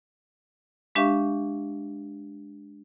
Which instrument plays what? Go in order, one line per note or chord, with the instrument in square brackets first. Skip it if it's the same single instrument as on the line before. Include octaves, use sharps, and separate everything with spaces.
[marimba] G#3 D4 G4 E5 F5 C#6